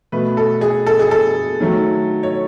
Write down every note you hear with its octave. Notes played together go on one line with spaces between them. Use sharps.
B2 A3 B4
A4
G#4
A4
G#4
A4
D#3 F#3 A3
C#5